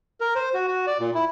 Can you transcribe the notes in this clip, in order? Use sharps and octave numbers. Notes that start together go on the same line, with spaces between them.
A#4
C5
F#4
F#4
D5
A#2
E4